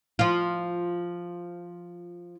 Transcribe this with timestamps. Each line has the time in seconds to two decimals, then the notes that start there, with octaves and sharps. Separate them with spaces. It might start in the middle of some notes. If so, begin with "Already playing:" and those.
0.19 F3 F4